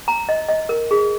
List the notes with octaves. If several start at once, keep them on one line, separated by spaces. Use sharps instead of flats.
A#5
D#5
D#5
A#4
G#4